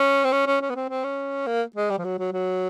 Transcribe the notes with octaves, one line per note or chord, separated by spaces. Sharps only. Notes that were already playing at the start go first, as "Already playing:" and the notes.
Already playing: C#4
C4
C#4
C#4
C#4
B3
C4
C4
C#4
A#3
G#3
G3
F3
F#3
F#3
F#3